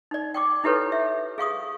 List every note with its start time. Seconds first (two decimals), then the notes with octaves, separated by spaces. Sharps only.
0.11 D#4 D5
0.34 G5 C#6 D6
0.64 D#4 E4 G4 A4 B4 C#5
0.92 E5
1.38 G#4 F5 C#6 D#6